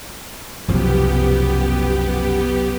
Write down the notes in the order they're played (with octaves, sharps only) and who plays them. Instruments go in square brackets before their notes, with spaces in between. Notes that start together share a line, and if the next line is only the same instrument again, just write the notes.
[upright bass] F#1 C2 [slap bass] F#2 B2 F3 [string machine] B3 G4